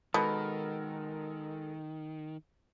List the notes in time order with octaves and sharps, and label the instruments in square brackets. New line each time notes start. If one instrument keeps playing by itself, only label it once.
[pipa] B2 [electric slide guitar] D#3 [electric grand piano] G#3 A4 A#4